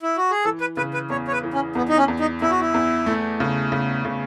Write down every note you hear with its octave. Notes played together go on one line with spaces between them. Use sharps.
E4
F#4
G#4
E3 A4
B4
C#3 B4
B4
E2 C#5
C#5
B4
E3
C#4
E2 B3
D#4
C#4
E2
D#4
E2 E4
F#4
E4
E2
A3
C#3
C#3
C#3